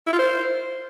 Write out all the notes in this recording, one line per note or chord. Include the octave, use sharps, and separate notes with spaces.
E4
F4
C5